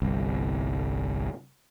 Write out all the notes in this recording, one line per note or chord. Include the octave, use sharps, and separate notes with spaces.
G1 C2